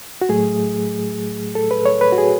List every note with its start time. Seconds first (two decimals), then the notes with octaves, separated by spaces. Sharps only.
0.22 F#4
0.29 A2 F#3 A3 G#4
1.55 A4
1.71 B4
1.86 C#5
2.01 B4
2.12 F#4
2.18 G#4